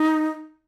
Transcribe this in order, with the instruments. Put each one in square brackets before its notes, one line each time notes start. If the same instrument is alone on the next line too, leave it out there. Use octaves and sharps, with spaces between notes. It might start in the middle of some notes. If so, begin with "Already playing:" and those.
Already playing: [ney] D#4